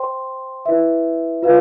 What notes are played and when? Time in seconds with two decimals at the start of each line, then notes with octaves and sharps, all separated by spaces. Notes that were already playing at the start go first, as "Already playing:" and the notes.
Already playing: C5 G5 C6
0.66 E4 B4 E5
1.42 F4 B4 F5